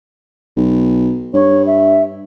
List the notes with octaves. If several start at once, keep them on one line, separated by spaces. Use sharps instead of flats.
B1
G2 C#5
E5